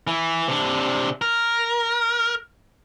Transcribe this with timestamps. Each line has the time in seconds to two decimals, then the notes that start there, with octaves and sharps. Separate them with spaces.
0.07 E3
0.48 C3 D4
1.22 A#4